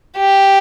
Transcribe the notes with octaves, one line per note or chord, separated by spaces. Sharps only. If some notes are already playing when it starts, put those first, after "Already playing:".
G4